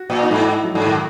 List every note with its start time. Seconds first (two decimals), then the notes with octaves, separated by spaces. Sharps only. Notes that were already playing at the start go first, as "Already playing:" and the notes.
Already playing: F#4
0.10 A#2
0.22 D#4
0.30 G#2 E4
0.64 F#3
0.75 G#2
0.86 D#3